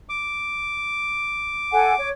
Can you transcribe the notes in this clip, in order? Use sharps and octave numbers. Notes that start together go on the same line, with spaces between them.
D6
A4 F#5 G#5
C#5